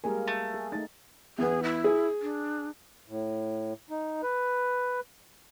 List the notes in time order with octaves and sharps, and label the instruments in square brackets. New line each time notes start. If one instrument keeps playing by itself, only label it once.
[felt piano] G3 G#3 G#5 [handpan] A#3 A#4
[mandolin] A3
[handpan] G#4
[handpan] A3 D#4 [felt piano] A6
[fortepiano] E2 B3 [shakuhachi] G#4
[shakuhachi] E4
[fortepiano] G#4
[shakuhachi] D4
[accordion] A2
D#4
B4